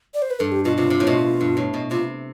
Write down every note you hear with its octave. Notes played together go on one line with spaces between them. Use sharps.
D5
C5
B4
G2 A4
G4
B2 F4
C3 F4
C3
A2
B2
G2
A2
B2
C3 F4